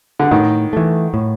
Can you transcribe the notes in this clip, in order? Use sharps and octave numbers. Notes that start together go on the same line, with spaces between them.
D3
A2 D#3
E3 A3
A2